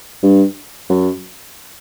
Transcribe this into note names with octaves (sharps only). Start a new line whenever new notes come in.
G2
F#2